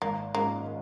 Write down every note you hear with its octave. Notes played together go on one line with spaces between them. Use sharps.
G#1 A#3
G#2 G#3 A#3 C#4 F4